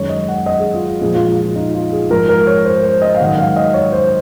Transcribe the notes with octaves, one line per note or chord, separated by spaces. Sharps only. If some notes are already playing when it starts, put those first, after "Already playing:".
Already playing: F#2 D#3 G#3 C#5
D#5
F#5
D#5
G#4
F4
A#2 F3 G#3 G#4
F4
F4
F4
D#4
F4
G#4
G#2 F3 G#3 A#4
A#4
C#5
C5
C5
D#5
F5
G#2 D#3 F#3 F#5
F5
D#5
C#5
C5